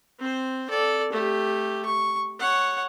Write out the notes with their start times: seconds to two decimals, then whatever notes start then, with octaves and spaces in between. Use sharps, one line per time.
0.20 C4 C5
0.70 A4 D5
1.12 A3 G4
1.85 C#6
2.39 C#5 F#5